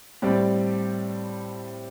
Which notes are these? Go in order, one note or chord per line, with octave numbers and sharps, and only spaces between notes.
A2 G3 C4 G4 D5